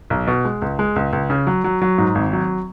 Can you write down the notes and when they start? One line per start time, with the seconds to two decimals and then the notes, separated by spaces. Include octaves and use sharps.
0.10 B1
0.27 B2
0.45 G#3
0.62 C#2
0.79 G#3
0.96 C#2
1.13 C#2
1.30 C#3
1.47 F#3
1.64 F#3
1.82 F#3
1.98 G#2
2.15 G#1
2.33 F#3